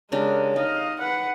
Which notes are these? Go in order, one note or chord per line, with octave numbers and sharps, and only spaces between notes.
C#3 G#3 D4 G4 A#4
D#4 D#5 F5
B4 F#5